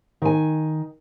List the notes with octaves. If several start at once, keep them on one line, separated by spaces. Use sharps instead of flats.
D#3 G#5